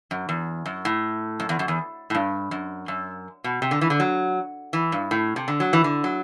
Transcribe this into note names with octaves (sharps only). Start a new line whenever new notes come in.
F#2
E2
F#2
A2
F#2
E2
F#2
E2
A2
G2
F#2
F#2
B2
C3
D3
E3
D3
F#3
E3
G2
A2
C3
D3
F#3
E3
D3
F#3